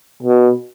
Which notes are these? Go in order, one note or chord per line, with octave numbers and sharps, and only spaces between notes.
B2